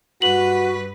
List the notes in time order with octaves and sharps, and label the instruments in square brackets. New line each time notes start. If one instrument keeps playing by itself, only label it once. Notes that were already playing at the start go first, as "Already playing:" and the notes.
[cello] G2 B4 [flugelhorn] F#4 [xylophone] F#7